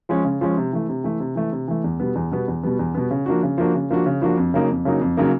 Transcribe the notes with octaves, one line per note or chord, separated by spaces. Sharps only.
F3 G#3 C#4
C#3
F3 G#3 C#4
C3
E3 A3
C3
E3 A3
C3
E3 A3
C3
E3 A3
E2
B2 G3 B3
E2
B2 G3 B3
E2
B2 G3 B3
E2
B2 G3 B3
C#3
F3 A#3 D4 F#4
C#3
F3 A#3 D4 F#4
C#3
F3 A#3 D4 F#4
C#3
F3 A#3 D4 F#4
F2
C#3 F#3 A#3 D#4
F2
C#3 F#3 A#3 D#4
F2
C#3 F#3 A#3 D#4